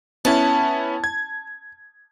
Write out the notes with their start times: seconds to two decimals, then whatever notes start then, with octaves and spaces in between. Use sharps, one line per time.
0.25 B3 C#4 E4 A5
1.04 G#6